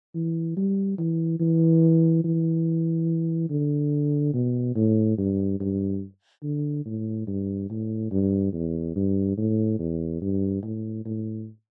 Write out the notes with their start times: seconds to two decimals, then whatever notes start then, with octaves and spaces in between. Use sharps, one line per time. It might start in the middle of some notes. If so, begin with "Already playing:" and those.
0.14 E3
0.57 G3
0.98 E3
1.40 E3
2.24 E3
3.50 D3
4.34 B2
4.75 A2
5.18 G2
5.60 G2
6.43 D3
6.85 A2
7.27 G2
7.70 A2
8.11 G2
8.53 E2
8.96 G2
9.37 A2
9.79 E2
10.21 G2
10.63 A2
11.05 A2